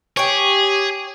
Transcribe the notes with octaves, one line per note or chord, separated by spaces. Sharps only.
G4 G#4 C#5